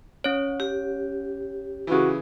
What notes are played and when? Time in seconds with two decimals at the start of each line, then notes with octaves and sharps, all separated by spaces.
0.24 C#4 C#5
0.60 G4
1.87 C#3 E3 F#4